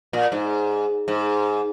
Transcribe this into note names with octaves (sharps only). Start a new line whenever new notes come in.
A#2
G#2
G#2